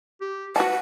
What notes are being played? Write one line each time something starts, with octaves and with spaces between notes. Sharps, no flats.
G4
F#4 B4 F#5 A5